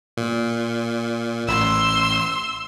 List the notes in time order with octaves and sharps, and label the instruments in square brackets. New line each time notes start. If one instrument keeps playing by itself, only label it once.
[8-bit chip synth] A#2
[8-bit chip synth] A1 [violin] C6 E6